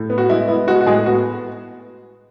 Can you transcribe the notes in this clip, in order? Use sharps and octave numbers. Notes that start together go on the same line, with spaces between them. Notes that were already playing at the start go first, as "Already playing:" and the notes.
Already playing: A2
B3
F#4
G#3 E4
B3 E4
G#3 F#4
F#4
A2 G#3 G#4
B3 F#4